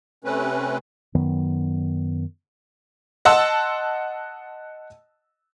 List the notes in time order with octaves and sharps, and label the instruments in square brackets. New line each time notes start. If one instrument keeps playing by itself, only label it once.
[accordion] C3 A3 C4 C#4 B4
[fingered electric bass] F#2 D#3 F#3 B3
[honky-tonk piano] D#5 F#5 A5 C6 E6